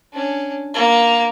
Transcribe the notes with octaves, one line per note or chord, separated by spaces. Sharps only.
C#4 D4
A#3